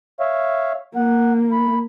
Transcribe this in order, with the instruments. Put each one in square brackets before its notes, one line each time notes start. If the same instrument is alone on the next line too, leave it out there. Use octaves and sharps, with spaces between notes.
[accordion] C#5 E5 F5
[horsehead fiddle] A#3 [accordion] F#5
[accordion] B5